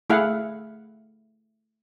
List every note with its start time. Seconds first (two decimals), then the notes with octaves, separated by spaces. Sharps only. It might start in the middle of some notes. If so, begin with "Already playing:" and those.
0.10 A3 E4 G#4 F5 F#5